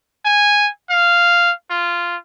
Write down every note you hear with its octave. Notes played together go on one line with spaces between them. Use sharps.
G#5
F5
F4